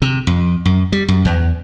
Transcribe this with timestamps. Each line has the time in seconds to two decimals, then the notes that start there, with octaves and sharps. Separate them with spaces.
0.02 C3
0.27 F2
0.65 F#2
0.92 G3
1.08 F#2
1.25 E2